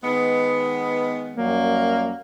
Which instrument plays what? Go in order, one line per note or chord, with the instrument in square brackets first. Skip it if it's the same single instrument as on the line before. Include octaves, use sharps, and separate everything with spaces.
[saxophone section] D#3 G#3 B3
[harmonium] F#2 F#3 G3 [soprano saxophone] A#3